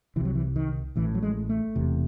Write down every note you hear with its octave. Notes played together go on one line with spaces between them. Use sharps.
C2 C3 E3 F#3
E3
D#3
A1 A2 E3
F#3
G#3
A3
E1 E2 C3